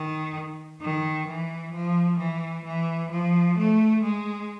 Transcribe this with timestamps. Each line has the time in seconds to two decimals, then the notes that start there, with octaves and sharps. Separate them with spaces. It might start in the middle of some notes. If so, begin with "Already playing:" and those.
Already playing: D#3
0.80 D#3
1.27 E3
1.73 F3
2.18 E3
2.65 E3
3.11 F3
3.57 A3
4.02 G#3